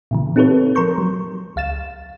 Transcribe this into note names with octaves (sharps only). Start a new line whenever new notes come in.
A#2 C#3 E3
C4 D#4 G4 A4 B4 C#5
F3 A#4 A#5 C6 C#6 G6
F#3
C#2 F5 A6 E7